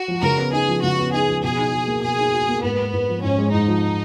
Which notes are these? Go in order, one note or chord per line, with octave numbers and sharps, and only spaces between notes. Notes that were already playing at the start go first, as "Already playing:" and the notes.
Already playing: F#4
F3
C#3 A#4
B3
D#4 G#4
F3
C#3 F#4
B3
D#4 G#4
F3
B2 G#4
D#4
F#4
A#3
B2 G#4
D#4
F#4
A#3
G#2 B3
G#3
G#2
F3
G#2 C#4
G#3
G#2 D#4
F3